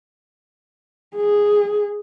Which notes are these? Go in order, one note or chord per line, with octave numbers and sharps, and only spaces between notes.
G#4